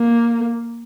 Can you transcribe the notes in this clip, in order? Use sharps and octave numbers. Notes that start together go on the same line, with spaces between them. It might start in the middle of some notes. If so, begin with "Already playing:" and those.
Already playing: A#3